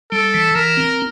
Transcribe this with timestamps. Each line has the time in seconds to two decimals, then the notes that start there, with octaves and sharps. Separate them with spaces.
0.12 G3 A4
0.34 E3
0.55 E3 A#4
0.77 C4